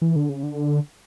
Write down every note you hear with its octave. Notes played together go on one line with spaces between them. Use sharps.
E3
D3
C#3
D3